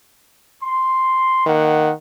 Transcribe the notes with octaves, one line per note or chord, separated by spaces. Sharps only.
C6
D#3 A#3 F#5